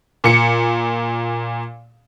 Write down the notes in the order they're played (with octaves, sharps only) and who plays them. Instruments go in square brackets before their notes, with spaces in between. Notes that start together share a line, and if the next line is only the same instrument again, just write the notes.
[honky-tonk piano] A#2 C#7